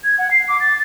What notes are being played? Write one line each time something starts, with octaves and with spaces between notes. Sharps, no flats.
G#6
F#5
C7
D6
A6